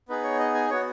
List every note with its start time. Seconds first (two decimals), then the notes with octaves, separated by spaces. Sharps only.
0.09 B3 D#4 G#4 B4
0.24 C#5
0.39 D#5
0.54 G#5
0.70 B3 F#4 C#5